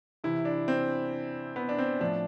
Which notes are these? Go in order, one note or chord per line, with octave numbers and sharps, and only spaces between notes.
C3 E3 E4
D4
C4
B3
D4
C4
A2 F3 D4